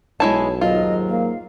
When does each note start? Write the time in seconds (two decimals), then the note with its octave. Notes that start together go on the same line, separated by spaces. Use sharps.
0.20 B1 G#3 E4 C#5 A5
0.61 D#2 G#2 F#3 F4 D#5
1.09 A#3 F5